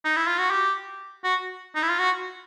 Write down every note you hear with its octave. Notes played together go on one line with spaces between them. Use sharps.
D#4
E4
F4
F#4
G4
F#4
D#4
E4
F4
F#4